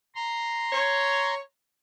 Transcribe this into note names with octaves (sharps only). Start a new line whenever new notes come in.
A#5 C6
C#5